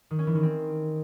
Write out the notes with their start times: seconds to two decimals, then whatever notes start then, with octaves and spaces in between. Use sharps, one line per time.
0.11 D#3
0.19 C#4
0.27 E3
0.35 D#3
0.43 C4